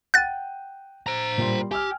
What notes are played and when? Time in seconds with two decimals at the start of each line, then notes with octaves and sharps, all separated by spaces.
0.14 F#5 G5 F#6 A6 D#7
1.07 C5 A#5
1.38 A#2 G3 C6
1.71 G4 G#5 E6 F6